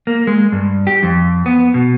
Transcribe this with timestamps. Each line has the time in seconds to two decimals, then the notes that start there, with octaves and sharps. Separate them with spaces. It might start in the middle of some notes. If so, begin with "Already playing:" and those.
0.07 A#3
0.27 G#3
0.52 G2
0.87 G4
1.03 F2
1.46 B3
1.74 B2